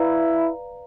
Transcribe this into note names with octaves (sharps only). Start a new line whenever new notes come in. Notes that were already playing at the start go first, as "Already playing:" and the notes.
Already playing: E4 B4 D5 F5 A#5